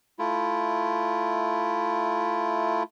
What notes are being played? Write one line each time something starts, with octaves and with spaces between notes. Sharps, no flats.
A3 E4 F4